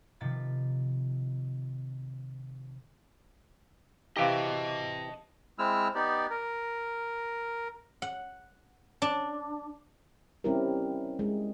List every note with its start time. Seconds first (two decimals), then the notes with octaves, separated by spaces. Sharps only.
0.21 C3 D#3 F3 F4 B5 A6
4.17 C3 E3 E4 G4 D#5 F5 A5
5.59 G#3 C4 E4 E6 F6
5.95 B3 D#4 G4 D5
6.31 A#4
8.02 F#5
9.02 D4
10.44 G3 C4 C#4 E4 G4 A#4
11.19 G#3